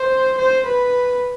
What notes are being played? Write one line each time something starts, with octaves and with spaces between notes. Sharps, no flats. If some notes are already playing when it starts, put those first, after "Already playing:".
Already playing: C5
C5
B4